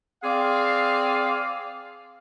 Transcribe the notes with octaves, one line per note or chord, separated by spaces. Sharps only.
C4 G#4 D5 F5